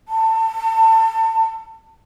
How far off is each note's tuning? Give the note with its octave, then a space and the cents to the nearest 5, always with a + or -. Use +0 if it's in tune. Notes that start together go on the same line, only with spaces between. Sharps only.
A5 +30